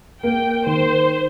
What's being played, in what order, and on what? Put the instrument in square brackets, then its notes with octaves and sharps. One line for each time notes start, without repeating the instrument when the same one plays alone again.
[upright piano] A#3 [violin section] G5
[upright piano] D#3 [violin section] C5